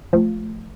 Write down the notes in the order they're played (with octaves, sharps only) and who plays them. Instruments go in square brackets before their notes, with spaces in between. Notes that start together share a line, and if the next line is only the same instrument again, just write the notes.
[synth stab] F3 [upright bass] A3